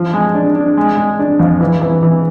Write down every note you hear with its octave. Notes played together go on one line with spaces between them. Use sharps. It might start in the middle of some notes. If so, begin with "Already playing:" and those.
Already playing: F3
G#3
D4
D4
G#3
G#3
D4
F2
E3
E3
E3